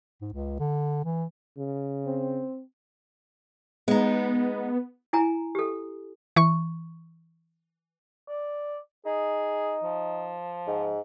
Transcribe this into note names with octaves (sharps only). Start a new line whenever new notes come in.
G#2
C#2
D3
E3
C#3
C4
G#3 B3 D#4
E4 G#5 A#5
G4 A4
E3 C#6
D5
D#4 G#4
F3
G#2